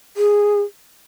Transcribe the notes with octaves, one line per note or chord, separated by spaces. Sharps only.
G#4